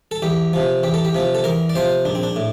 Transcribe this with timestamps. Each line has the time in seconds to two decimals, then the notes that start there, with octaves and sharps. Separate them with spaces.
0.11 A4
0.22 E2 G4
0.53 C3 F3
0.83 E2 G4
0.94 A4
1.05 G4
1.15 C3 F3
1.35 A4
1.44 E2 A#4
1.69 D5
1.75 C3 F3 C5
2.05 A#1 D4
2.15 C4
2.23 D4
2.36 A2